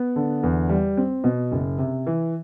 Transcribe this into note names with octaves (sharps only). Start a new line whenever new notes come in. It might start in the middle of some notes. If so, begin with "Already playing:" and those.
Already playing: B3
D3
E2
G3
C4
B2
F#1
C3
E3